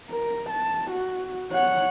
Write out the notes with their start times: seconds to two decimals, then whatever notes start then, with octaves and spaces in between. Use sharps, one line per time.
0.11 A#4
0.50 A5
0.91 F#4
1.51 C#5 F#5